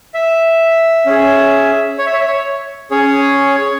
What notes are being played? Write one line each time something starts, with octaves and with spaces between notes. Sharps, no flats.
E5
C#4 G#4
C#5
E5
C#5
E5
C#5
C#4 G#4 C#5